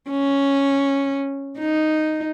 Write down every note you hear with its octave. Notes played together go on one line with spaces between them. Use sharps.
C#4
D#4